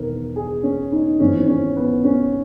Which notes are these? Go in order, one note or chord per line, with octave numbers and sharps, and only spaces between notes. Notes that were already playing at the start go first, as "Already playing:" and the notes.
Already playing: E1 E2 D#3 A#4
G#4
C#4
D#4
G#1 G#2 E3 C#4
C#4
B3
C#4